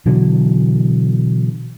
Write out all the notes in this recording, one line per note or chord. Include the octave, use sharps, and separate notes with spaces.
B2 D3 E3 F#3